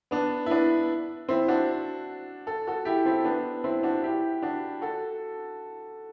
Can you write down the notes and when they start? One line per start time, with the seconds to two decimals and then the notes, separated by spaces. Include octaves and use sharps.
0.11 B3 D4
0.46 E4
0.50 B3 D4
1.29 C4 E4
1.48 D4 F#4
2.47 A4
2.67 F#4 A4
2.85 E4 G4
3.05 C4 E4
3.24 B3 D4
3.64 C4 E4
3.83 D4 F#4
4.03 E4 G4
4.42 D4 F#4
4.82 F#4 A4